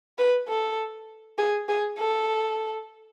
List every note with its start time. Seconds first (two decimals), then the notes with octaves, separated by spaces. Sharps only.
0.18 B4
0.49 A4
1.38 G#4
1.69 G#4
1.98 A4